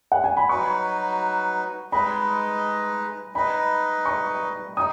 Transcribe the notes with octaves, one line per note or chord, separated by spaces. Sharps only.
F#5
G#5
B5
F#3 D#4 F#4 B4 C#6
G#3 D#4 B4 D#5 B5
D#4 B4 D#5 B5
C#6
D#4 D#6